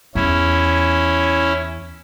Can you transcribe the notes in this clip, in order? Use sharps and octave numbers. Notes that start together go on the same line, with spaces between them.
E2 C#4 E4